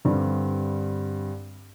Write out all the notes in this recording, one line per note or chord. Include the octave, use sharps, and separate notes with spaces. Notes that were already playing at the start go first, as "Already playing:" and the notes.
G2 D3 G3 C4